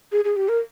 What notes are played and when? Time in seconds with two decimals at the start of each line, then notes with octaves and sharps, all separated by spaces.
0.12 G#4
0.25 G#4
0.36 G4
0.49 A#4